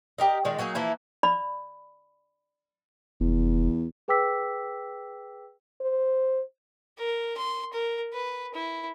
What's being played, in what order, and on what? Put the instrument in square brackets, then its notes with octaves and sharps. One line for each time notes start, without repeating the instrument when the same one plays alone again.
[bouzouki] G4 A#4 D#5
D#3 G#3 F4 D5
F#3 A#3 D#4 G#4
E3 F3 A#3 E4
[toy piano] D5 B5
[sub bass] F1 [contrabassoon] E2
[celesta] G#4 B4 G5 D6 E6 B6
[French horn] C5
[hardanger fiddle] A#4
C6
A#4
B4
E4